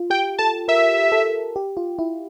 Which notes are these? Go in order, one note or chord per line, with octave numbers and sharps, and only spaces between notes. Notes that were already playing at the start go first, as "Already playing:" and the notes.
Already playing: F4
G4 G5
A4 A5
A#4 E5
A4
G4
F4
E4